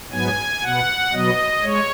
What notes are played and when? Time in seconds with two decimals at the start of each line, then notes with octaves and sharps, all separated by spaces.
0.11 G#2 F#3 B3 G#5
0.62 B2 B3 F#5
1.13 B2 F#3 B3 D#5
1.62 G#3 C#5